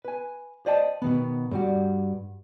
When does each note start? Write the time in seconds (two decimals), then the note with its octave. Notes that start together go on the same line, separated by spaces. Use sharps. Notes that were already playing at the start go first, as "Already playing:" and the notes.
0.05 B4 G#5
0.66 C5 D5 D#5 G5 A5
1.02 B2 D#3 B3
1.51 G2 G3 F#4